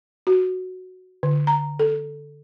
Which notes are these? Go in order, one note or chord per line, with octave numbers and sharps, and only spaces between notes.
F#4
D3
A#5
A4